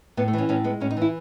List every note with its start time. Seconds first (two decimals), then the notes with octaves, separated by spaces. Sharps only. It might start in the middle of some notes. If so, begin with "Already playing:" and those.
0.17 A2 B3
0.28 A3
0.33 E3 C#4
0.49 A2 C#4
0.64 G#3 B3
0.81 A2 C#4
0.91 D#4
0.97 E3 E4